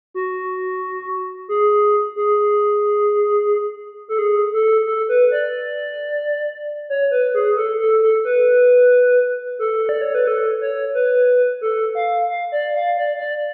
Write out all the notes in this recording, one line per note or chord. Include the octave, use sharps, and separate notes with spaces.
F#4
G#4
G#4
A4
G#4
A4
A4
B4
D5
C#5
B4
G#4
A4
A4
A4
B4
A4
D5
C#5
B4
A4
C#5
B4
A4
F5
F5
D5
F5
D5
D5